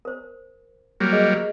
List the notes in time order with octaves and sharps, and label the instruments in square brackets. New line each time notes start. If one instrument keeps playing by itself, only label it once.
[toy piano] A#4 C5
[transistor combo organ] F#3 G3 A#3
[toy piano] G#4 A#4 D#5